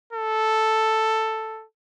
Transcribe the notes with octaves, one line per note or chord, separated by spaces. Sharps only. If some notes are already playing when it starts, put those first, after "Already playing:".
A4